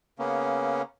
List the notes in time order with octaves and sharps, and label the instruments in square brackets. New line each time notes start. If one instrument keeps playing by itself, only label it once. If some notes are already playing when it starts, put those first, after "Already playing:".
[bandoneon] C#3 A#3 B3 C#4